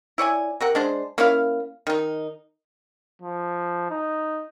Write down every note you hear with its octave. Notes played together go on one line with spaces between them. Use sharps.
E4 C#5 D5 G#5
C3 A#4 F#5
G#3 D4 C5
A#3 C#4 E4 F5
D#3 D#4
F3
D#4